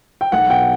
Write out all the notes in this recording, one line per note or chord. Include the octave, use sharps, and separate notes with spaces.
G5
B1 F#5
B2 G5